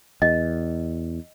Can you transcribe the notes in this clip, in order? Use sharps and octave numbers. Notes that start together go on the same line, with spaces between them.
E2 D#5